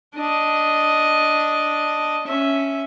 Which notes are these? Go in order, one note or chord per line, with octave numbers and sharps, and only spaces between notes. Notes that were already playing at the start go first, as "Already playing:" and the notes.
D4 D#5
C#4 E5